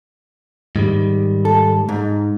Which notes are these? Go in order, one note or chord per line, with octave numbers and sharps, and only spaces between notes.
G#2 D#3 G3
A4
G#2